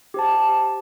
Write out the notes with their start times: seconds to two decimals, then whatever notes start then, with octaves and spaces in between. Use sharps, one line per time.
0.14 G4 C5 A5